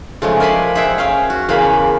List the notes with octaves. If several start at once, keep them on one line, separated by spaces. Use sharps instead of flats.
C#3 F3 G#3 A3
A#4 D5 G#5 A5 B5 C6
G#4 C5 E5 F#5 G5
C#4 F5
F#4
E2 C#3 A#3 F5 B5